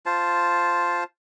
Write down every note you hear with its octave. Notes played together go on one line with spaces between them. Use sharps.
F4 C5 A5